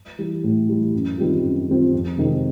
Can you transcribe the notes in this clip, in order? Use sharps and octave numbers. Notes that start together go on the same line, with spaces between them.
E3 G3
A2
E3 G3
F#2
D#3 G3 C4 F4
F#2
D#3 G3 C4 F4
F2
C3 D#3 G#3 C4